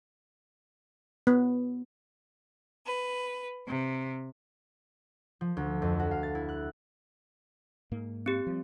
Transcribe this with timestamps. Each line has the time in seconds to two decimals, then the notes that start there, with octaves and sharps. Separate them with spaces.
1.27 B3
2.86 B4
3.66 C3
5.41 F3
5.57 D2
5.82 F2
5.99 F#4
6.11 F5
6.23 A6
6.35 E4
6.49 F#6
7.92 G#2 A#3
8.26 C4 G4
8.47 F3 G3